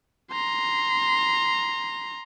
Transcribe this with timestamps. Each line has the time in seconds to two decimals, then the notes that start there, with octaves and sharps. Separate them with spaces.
0.31 A#5 C6